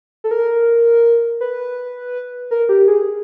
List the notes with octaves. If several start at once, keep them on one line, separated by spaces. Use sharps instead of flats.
A4
A#4
B4
A#4
G4
G#4